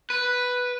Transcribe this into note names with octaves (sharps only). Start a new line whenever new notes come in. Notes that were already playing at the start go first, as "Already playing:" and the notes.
B4